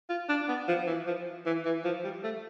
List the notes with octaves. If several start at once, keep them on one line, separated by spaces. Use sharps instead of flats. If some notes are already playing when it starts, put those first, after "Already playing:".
F4
D4
B3
F3
E3
F3
E3
E3
F3
G3
A3